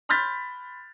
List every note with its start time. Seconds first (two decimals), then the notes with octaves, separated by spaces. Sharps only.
0.09 B5 C6 F6 G6 A6 B6